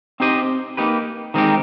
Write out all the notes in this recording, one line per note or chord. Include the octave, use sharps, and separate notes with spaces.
C4 D#4 G4 C5 D#5
A#3 D#4 G4 B4
D#3 G#3 C4 D#4 G4